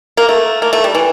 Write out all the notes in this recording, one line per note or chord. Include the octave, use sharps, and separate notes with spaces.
A#3
A3
A#3
A3
G3
E3